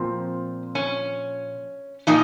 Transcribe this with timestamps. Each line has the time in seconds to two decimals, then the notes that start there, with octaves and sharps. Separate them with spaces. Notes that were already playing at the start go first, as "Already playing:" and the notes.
Already playing: A#2 F3 C4
0.75 C#4
2.07 A#2 F3 D#4